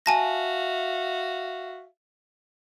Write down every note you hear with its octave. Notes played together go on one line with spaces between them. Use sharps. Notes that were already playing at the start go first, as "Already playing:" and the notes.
F#4 E5 F5 G#5 A5 A#6